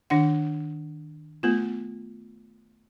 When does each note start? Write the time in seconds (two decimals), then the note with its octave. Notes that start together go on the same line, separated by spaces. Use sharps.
0.10 D#3 D4 F#5
1.43 A3 B3 F4